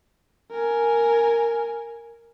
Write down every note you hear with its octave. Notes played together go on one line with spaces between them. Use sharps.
A#4 G#5